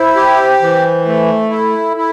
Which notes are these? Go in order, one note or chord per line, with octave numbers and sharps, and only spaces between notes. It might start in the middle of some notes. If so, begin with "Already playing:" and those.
Already playing: E4 C5
G4
E3
A3
E4 A4
E4